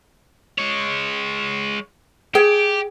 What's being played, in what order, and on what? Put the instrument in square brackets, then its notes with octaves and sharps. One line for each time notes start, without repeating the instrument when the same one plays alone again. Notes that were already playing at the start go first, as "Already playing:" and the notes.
[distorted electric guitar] G#3 C#5
[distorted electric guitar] G4 [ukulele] G#4 G5